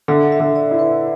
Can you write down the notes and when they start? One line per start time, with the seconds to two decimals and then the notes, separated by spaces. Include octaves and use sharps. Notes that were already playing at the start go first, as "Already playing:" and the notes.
0.08 D3 E5
0.32 E5
0.40 D3
0.56 D5
0.71 E4
0.79 B4